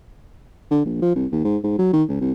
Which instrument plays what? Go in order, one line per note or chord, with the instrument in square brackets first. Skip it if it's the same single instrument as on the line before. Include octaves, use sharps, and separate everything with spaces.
[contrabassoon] D3
A#1
F3
C2
D#2
G#2
G#2
F#3
D#3
C#2
C2